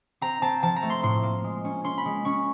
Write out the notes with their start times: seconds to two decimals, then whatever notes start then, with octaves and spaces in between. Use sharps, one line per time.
0.21 C4 A#5
0.42 C4 A5
0.63 F3 A5
0.76 A#5
0.83 A3
0.90 C6
1.03 A2 C6
1.23 A#3
1.44 G#3
1.65 C#4
1.84 C#4 C6
1.98 B5
2.05 G#3
2.25 C#4 C#6